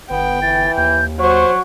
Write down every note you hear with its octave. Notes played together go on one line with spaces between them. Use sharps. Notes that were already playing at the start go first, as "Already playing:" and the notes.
G1 B3 G5
E3 A6
D#2 G6
F#3 C5 C#6